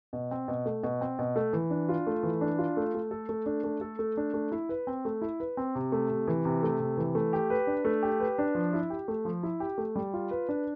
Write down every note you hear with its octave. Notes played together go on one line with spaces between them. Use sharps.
B2
C4
B2
A3
B2
C4
B2
A3
E3
D4
F4
A3
E3
D4
F4
A3
A3
A4
A3
D4
A3
A4
A3
D4
A3
E4
B4
C4
A3
E4
B4
C4
C3
A3
C3
E3
C3
A3
C3
E3
A3
G4
B4
D4
A3
G4
B4
D4
F3
E4
G4
A3
F3
E4
G4
A3
G3
F4
B4
D4